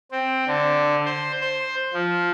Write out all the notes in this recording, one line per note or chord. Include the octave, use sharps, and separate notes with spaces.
C4
D3
C5
C5
F3